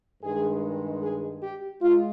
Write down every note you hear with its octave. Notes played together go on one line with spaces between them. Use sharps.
G2 D#3 G#3 G#4
G#4
G4
G#3 F4